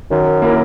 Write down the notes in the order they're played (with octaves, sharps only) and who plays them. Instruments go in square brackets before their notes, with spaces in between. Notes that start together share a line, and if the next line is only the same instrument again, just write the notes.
[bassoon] F#2 [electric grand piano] D#3
[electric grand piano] A#3 E4 A#4